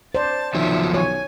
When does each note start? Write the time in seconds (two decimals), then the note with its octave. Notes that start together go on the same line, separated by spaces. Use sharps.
0.15 C5 D5 A5
0.55 B1 D#3 F3 F#3 E5
0.94 C#5 G#5